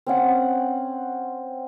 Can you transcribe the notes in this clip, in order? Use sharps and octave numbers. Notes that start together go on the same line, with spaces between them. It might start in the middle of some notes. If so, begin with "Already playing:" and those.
C4 C#4 F#5